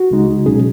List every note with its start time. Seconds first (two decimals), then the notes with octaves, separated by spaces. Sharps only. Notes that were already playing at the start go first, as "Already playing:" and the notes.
Already playing: F#4
0.10 C#2 C#3 G#3 D#4
0.46 B2 F#3 C#4 G#4